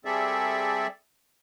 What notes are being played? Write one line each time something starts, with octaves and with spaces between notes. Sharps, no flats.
G3 C4 G#4 A4 D5 E5